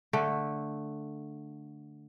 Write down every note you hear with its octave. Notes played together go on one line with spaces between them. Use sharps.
D3 A3